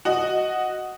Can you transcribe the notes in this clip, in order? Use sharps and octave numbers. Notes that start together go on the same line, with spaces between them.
F#4 D#5